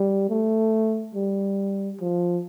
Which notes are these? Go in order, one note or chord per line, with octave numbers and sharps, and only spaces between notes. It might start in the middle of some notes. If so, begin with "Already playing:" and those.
Already playing: G3
A3
G3
F3